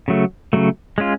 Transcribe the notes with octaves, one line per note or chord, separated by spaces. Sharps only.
C#3 F#3 A3
C#3 F#3 A3
G#3 C#4 F4